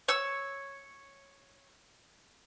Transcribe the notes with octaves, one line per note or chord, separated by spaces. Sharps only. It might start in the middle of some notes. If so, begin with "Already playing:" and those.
C#5 E6